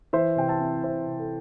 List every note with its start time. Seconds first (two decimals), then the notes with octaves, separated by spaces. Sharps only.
0.13 E3 C5 E5
0.36 C3 G5
0.48 E5 A5
0.60 C4
0.83 C3 C5 E5
1.06 C3
1.19 A4